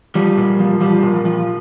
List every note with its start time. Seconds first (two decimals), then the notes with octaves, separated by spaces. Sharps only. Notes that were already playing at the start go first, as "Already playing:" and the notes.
0.15 F3 G3
0.37 A#2
0.59 F3
0.81 F3 G3
1.03 A#2
1.14 F3
1.25 F3